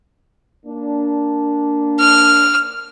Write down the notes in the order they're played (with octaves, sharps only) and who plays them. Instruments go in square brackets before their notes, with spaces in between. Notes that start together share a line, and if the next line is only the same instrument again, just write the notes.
[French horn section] A#3 D4
[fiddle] F6